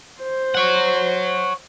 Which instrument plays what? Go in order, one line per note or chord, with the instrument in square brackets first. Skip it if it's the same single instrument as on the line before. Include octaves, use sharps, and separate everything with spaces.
[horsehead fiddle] C5
[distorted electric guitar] C#5 F#5